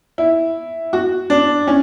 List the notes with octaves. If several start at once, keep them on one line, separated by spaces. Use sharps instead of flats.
E4
F#4
D4
C#4